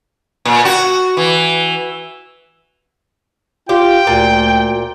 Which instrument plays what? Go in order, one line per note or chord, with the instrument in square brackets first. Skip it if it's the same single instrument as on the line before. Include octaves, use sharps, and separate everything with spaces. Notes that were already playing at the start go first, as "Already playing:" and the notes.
[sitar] A#2
F#4
E3
[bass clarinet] F4 [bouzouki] G4 [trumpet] G5
[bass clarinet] D2 [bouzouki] A#2